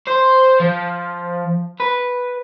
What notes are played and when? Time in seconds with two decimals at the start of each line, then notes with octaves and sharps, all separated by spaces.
0.07 C5
0.60 F3
1.80 B4